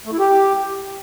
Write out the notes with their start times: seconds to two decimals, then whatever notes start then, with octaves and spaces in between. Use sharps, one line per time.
0.06 A3
0.12 E4
0.19 G4